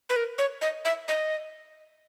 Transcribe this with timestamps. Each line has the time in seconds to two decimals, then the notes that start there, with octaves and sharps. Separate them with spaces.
0.10 B4
0.16 A#4
0.38 C#5
0.61 D#5
0.85 E5
1.08 D#5